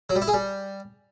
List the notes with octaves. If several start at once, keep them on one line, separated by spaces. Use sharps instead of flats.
F#3
G3
E4
G#4
G3